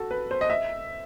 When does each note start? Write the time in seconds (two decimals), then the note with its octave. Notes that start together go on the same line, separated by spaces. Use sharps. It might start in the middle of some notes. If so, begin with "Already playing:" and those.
Already playing: F#4 A4
0.11 B4
0.31 C5
0.41 D#5
0.50 E5